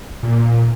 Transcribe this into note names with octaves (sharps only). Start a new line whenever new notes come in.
A#2